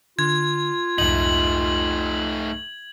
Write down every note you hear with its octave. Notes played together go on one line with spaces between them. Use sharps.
D3 F4 G#6
C2 F2 G#2 A3 D#4 F#7